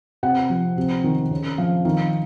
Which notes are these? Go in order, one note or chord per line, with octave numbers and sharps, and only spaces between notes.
C3 F#5
F3
C3
D#3
C#3
F3 F5
D#3 F5